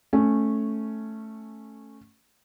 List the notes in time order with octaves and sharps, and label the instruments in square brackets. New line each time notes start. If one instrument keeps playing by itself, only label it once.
[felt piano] A3 C#4